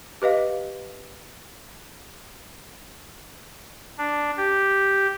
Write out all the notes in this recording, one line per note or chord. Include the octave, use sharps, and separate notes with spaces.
G4 B4 D#5 F5
D4
G4